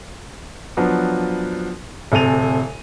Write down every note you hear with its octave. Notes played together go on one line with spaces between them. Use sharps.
F3 F#3 B3 D4
D1 C3 A4 G#5 D#7 F7